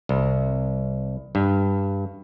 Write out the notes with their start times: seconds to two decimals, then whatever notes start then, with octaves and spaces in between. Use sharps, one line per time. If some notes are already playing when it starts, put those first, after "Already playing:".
0.09 C2
1.35 G2